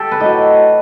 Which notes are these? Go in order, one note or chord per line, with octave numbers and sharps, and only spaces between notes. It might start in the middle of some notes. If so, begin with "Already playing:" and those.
Already playing: G4 A4
B4
A2 F#3 D#5